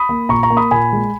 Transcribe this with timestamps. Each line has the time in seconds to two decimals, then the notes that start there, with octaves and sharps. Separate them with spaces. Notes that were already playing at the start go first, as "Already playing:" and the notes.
Already playing: B5 D#6
0.09 A#3
0.29 A#2 A#5 C#6
0.43 A#5 C#6
0.50 A#3
0.57 B5 D#6
0.71 A#2 G#5 B5
0.92 G#3